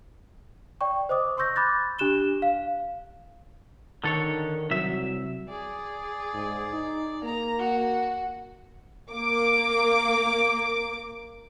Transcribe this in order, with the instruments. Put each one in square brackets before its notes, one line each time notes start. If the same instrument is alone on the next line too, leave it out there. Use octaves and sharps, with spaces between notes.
[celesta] D5 G5 C#6
C5 D#5 D6 D#6
C6 C#6 E6 G6 A#6
B5 D6 F#6 G6 A6 A#6
D4 G4 F#6 E7 G7
F5
[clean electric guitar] D3 A4 C#5 [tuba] D#3
[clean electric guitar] C2 E5 [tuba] F#3
[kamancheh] G#4 D5
[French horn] G#2
D#4
[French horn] A#3 [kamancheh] A#5
[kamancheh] F#4
[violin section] A#3 D6